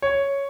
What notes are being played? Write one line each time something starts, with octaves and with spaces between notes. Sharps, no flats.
C#5